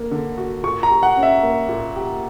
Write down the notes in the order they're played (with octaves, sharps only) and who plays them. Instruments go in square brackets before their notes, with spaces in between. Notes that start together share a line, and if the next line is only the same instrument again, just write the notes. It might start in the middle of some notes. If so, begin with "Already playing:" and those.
Already playing: [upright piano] A#3
D3
F#4
[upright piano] A#2 [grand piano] C#6
[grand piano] A#5
[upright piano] G4
[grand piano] F#5
[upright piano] C#4
[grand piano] E5
[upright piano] A#3
A#2
G4